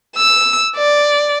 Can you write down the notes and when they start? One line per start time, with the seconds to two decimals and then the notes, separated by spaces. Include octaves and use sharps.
0.17 E6
0.76 D5